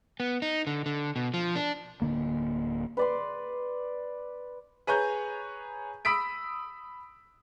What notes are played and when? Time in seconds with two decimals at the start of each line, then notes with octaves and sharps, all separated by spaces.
0.20 B3
0.42 D#4
0.67 D3
0.86 D3
1.16 B2
1.34 F3
1.56 D4
2.02 D1 D3 A#3
2.97 B4 D5 C6
4.87 G#4 B4 C#5 A#5 G6
6.05 B5 D#6 E6 B6 D7